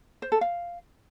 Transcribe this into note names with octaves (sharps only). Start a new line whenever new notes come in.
C5
A4
F5